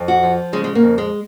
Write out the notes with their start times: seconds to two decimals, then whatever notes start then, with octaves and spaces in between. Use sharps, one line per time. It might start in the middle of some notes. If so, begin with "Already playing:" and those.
Already playing: F2
0.08 F#4
0.23 F3
0.53 C#3 G#3
0.64 G#3
0.75 A#3
0.82 F2
0.98 G#3